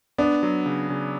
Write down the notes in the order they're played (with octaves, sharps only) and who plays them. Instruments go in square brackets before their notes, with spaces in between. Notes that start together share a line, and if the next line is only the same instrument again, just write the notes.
[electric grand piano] B3 [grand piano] D4
[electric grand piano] F#3
C#3
C#3